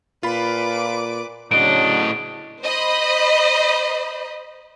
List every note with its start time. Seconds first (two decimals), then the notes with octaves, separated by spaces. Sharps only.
0.23 A#2 F4 B4 B5 D6
1.51 A2 C#3 F#3 D4 D#5 D7
2.61 C5 D#5 B5